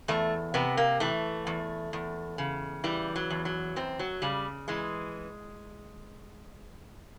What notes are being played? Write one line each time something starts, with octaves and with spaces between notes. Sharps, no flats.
E2 A3
C3 B3
A#3
E3 A3
E2
E2
C#3
E3 G3
F#3
E2
F#3
F#2 C4
F#3
C#3 G3
E3 G#3